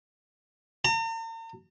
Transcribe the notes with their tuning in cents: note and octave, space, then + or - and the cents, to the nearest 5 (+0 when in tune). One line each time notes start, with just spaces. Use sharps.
A#5 -45